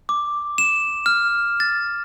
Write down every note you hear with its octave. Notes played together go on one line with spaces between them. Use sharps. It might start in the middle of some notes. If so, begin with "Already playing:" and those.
D6
E7
F6
A6